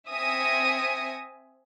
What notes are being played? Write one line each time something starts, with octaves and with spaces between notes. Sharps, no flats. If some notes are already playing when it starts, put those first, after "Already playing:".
C4 E5 G#5 D#6 A#6 C#7